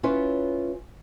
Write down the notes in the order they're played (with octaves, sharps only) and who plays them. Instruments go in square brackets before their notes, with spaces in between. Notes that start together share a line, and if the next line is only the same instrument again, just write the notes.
[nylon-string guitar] C#4 E4 F4 B4 C#5